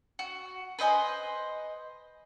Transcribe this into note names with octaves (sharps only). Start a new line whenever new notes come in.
F#4
B4 C5 D#5 G#5